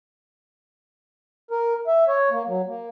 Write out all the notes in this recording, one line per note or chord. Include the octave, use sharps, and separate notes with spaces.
A#4
E5
C#5
A#3
F#3
A#3